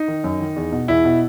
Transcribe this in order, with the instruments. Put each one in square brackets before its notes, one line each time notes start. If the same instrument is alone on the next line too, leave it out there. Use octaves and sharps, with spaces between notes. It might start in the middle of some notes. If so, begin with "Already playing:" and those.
Already playing: [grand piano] D#4
D#3
F#2
D#3
E2
B2
E2 E4
B2